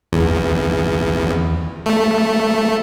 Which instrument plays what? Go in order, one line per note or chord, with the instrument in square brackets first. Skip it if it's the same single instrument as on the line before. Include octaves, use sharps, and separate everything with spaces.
[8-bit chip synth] E2
A3